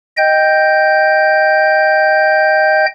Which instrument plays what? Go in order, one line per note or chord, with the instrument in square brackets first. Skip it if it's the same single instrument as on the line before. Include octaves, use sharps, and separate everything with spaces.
[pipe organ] D#5 G5 G6